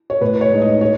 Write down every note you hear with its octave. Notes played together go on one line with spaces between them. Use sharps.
C#5
A2 B4
C#5
G#3 D#4
D#5
C#5